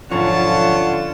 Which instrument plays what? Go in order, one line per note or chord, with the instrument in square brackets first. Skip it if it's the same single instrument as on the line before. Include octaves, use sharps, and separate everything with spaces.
[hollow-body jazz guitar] B1 G#2 F3 [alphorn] D3 [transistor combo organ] C#4 [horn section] F4 F#5 A5